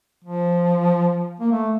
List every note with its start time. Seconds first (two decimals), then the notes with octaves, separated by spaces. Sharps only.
0.24 F3
1.40 A#3
1.52 A3